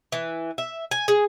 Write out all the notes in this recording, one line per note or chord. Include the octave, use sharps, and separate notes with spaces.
E3
E5
G#5
G#4